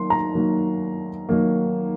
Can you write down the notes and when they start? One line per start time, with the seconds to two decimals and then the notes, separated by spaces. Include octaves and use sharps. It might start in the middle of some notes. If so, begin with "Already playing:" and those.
Already playing: D#3 F#3 A#3 C6
0.10 A#5
0.34 D#3 F#3 A#3
1.29 D#3 F#3 A#3